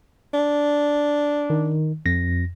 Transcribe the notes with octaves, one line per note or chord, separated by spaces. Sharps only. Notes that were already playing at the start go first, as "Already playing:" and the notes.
D4
D#3
F2 A#6